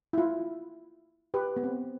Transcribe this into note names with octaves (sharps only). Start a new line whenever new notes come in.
E4
F4
G4 B4
B3
C4